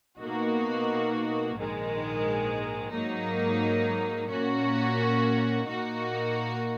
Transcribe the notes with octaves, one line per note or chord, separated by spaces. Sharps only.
B2 A#3 D#4 F#4
A#1 G#2 D#3 G#3
G#2 F#3 A#3 D#4
A#2 A#3 C#4 F#4
A#2 A#3 D#4 F#4